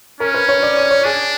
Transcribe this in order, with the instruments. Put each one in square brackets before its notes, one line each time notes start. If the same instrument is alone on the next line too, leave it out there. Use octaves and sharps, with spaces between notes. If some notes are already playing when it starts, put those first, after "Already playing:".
[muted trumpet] C#4 [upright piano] A#4
[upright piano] B4
C#5
D5
C#5
C#5
[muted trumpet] D4 [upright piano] G#4